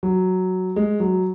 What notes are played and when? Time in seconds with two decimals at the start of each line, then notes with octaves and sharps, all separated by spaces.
0.03 F#3
0.76 G#3
1.00 F#3